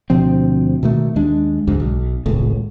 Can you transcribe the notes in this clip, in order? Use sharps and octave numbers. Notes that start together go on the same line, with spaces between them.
D2 B2 F3 C4
B2 D#3 A3
D#2 G#3 D4
D2 G#2
B1
D#1 G#1 C#2 A2